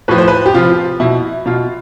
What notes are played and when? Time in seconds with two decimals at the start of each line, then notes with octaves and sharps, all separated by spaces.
0.08 A2 F3 B4
0.18 C5
0.28 B4
0.46 G4
0.54 C3 F3 F4
1.00 B2 E4
1.46 B2 F4